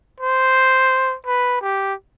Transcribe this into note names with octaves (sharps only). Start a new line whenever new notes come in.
C5
B4
G4